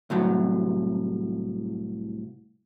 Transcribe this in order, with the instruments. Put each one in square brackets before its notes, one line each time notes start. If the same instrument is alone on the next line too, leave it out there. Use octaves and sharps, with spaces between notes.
[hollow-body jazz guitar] C2 A2 F#3